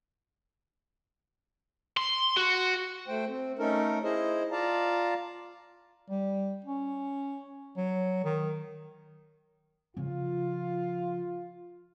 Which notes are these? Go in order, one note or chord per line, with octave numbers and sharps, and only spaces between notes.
C6
F#4
A3 C5 G5
C4
A3 C#4 D#4 A4 A#4
E4 G#4 C5 D#5
F4 D5 F5 A5 A#5
G3
C#4
F#3
D#3
C#3 F3 F4